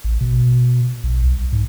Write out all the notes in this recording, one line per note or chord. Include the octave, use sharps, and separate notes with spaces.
A1
B2
B1
C2
G#2